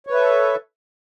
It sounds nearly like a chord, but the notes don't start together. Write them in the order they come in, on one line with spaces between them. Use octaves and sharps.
C#5 B4 E5 A4